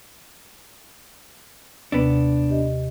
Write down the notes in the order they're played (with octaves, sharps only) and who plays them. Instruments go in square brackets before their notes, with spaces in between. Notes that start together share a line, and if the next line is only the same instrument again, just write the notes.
[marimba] D#2 C3 [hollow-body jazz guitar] B3 D4
[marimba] G4 D#5